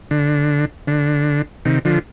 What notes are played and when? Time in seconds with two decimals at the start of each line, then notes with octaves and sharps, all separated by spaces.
0.11 D3
0.87 D3
1.65 C3 D#3
1.85 D3 F3